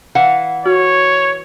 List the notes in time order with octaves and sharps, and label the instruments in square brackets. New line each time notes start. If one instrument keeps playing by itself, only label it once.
[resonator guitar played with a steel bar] E3 F5 F#5
[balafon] F#4 [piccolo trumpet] C#5